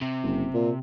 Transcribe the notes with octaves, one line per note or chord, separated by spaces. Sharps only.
C3
F#1
A#2